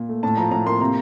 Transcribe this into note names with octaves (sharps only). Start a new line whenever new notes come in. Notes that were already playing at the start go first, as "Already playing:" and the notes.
Already playing: A#2
A3
A2 A5
F3 A#5
A2 A#5
A#3 C6
C3 A#5